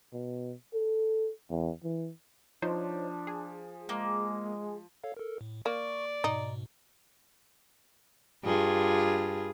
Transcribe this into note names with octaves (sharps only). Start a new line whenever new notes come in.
B2
A4
E2
E3
F3 D4 D#4 C5 C#5
G#4
G#3 A#3
A4 C#5 F5
A4 A#4
A2
A#3 D5 C#6
G#2 B2 D#4
G2 F4 G#4